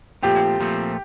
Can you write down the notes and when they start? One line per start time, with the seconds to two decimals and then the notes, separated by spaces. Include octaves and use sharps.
0.23 A#2 F3 A3 C4 G4
0.60 A#2 F3 A3 C4